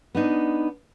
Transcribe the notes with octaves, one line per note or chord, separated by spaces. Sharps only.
B3 D4 D#4